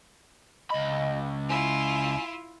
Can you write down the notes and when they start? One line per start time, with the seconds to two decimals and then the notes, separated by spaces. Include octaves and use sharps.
0.70 C#2 D#5 B5
1.49 E4 F4 G#5